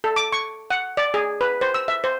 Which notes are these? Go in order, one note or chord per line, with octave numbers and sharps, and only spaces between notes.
A4
D6
C#6
F#5
D5
G#4
B4
C5
E6
E5
C5